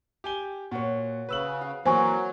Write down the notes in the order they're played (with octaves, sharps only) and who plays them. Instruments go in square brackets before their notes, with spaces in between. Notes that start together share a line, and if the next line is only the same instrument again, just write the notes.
[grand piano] G4 G#5 G7
[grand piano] A#2 [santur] F#4 C#5
[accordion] C#3 [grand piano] B4 E6 F#7
[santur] F5
[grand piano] E3 A#3 [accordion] F#3 [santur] C4 F#4 [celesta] C5 G#5 C#6